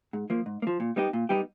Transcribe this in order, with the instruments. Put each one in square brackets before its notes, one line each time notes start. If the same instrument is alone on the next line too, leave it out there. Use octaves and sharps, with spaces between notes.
[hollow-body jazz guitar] G#2
F3 A#3
G#2
A#3
F3
A#2
G3 B3 D#4 G4
A#2
G3 B3 D#4 G4